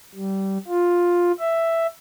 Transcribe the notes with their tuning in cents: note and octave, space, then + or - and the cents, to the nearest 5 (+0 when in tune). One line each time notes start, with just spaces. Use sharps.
G3 -20
F4 +10
E5 +5